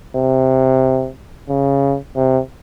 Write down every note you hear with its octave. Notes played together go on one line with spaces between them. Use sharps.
C3
C#3
C3